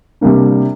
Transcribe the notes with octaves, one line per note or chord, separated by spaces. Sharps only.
C3 G3 A#3 D4